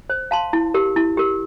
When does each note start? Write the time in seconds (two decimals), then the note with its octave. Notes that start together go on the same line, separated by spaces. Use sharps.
0.10 C5
0.31 F5 A5 C6
0.53 E4
0.74 G4 A#4
0.96 E4
1.17 G4 A#4